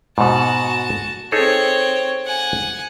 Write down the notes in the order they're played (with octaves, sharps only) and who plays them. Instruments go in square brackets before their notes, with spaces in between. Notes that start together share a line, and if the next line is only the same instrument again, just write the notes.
[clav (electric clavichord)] G#2 B2 [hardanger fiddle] F#4 A5
[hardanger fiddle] C4 C#5 [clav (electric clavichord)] D#4 G#4 A4
[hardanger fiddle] F#5 G#5